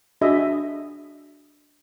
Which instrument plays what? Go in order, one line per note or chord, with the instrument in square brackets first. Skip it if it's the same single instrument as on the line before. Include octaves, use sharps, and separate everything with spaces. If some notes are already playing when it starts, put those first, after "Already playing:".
[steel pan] D4 F#4 G#4 D#5 E5